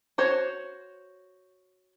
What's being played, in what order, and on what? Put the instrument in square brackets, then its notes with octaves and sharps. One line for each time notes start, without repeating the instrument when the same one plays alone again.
[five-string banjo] F#4 C5 C#5